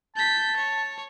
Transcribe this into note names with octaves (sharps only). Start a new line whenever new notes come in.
A5 G6 B6
C#5